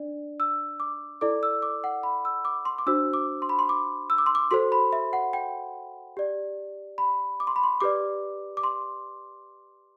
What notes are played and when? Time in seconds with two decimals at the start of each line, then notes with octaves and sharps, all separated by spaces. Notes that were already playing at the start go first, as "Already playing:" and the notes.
Already playing: D4 D5
0.40 E6
0.80 D6
1.21 E4 A4 D5 D6
1.43 E6
1.62 D6
1.84 F#5
2.03 B5
2.25 E6
2.45 D6
2.65 C6
2.78 D6
2.87 D4 F#4 C5 E6
3.14 D6
3.42 C6
3.49 B5
3.59 C6
3.69 D6
4.10 E6
4.18 D6
4.26 C6
4.35 D6
4.51 F#4 A4 C5 C6
4.72 B5
4.93 E5
5.13 F#5
5.33 G5
6.17 G4 D5
6.98 B5
7.40 D6
7.47 C6
7.56 B5
7.63 C6
7.80 G4 B4 D5 D6
8.57 D6
8.63 C6